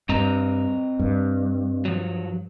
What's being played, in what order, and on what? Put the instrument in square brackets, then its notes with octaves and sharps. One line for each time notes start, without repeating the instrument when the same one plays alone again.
[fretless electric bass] G2 [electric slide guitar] C4 D#5 A#5
[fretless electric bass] G2
[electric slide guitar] F3 F#3